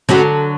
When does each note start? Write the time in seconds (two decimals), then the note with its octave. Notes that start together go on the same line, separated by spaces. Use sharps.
0.09 D3 F#3 G#3 C#4 F#4 A4